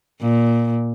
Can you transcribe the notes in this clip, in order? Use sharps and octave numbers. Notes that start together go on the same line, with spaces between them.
A#2